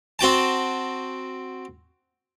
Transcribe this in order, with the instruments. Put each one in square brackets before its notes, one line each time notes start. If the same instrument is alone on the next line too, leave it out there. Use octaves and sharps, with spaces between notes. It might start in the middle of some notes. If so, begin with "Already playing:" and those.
[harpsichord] C4 F#4 G5 A5